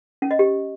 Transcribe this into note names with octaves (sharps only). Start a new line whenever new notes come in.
C#4
D#5
G4